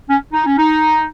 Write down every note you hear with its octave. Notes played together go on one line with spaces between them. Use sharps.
C#4
D#4
C#4
D#4